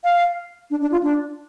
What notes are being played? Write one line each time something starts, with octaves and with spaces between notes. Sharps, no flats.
F5
D4
D4
F4
D4